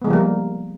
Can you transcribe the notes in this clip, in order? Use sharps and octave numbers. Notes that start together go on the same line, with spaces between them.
F3 G3 G#3 A#3 B3